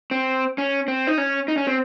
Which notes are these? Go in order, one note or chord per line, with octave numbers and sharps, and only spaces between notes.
C4
C#4
C4
D#4
C#4
D#4
C#4
C4